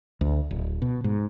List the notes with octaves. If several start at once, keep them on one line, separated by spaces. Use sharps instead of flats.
D2
D1
B2
G#2